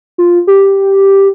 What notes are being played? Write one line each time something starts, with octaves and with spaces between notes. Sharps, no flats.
F4
G4